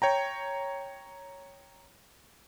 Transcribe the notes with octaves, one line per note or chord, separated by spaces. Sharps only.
C#5 G5 A#5